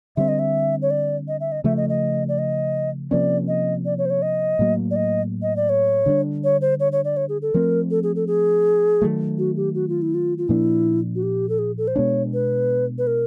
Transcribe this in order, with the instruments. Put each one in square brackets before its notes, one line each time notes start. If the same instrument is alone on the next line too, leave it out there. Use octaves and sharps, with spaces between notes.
[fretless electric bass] D3 G3 C4 [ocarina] E5
[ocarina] D#5
E5
C#5
D5
D#5
E5
D#5
[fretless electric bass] C#3 F3 A3 [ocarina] E5
[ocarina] D#5
D#5
D5
D#5
[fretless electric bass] C3 F3 A#3 C#4 [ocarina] D5
[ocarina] D#5
D5
C#5
C5
C#5
D#5
[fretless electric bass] A2 F#3 A#3
[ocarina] D5
D#5
D#5
D5
C#5
[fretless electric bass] D3 G3 B3 D4
[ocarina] C#5
C5
C#5
C#5
D5
C#5
G#4
A4
[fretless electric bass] F3 A3 C4 [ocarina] A#4
[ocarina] A4
G#4
A4
G#4
[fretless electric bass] D#3 F#3 A3
[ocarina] F#4
G4
F#4
F4
E4
F4
F4
[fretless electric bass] A#2 F3 A#3 D4 [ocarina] E4
[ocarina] F#4
G4
A4
G#4
A4
C5
[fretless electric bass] B2 G#3 B3 D4 [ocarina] C#5
[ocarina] B4
B4
A#4